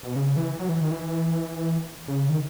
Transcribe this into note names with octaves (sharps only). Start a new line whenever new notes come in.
B2
C#3
E3
F#3
E3
D#3
E3
C#3
D#3